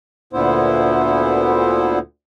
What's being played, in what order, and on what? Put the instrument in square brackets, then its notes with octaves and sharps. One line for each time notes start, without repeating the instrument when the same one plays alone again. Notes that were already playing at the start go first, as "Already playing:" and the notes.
[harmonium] D2 A#2 D3 B3 E4 C5